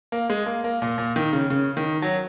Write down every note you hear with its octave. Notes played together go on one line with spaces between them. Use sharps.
A#3
G#3
A#3
A#3
A#2
A#2
D#3
C#3
C#3
D#3
F#3